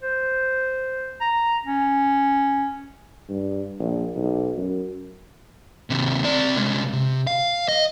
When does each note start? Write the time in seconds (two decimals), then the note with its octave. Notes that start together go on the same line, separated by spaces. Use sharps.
0.03 C5
1.21 A#5
1.66 C#4
3.29 G2
3.79 A#1
4.16 B1
4.57 F#2
5.90 D#2 C3
6.24 C4 D5
6.56 C2 G#3
6.93 C3
7.27 F5
7.68 D#5